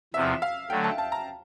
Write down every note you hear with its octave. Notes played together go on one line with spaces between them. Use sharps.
E2 C3 F3 E5
F5
D3 F#3 A3 G5
A5
A5
A#5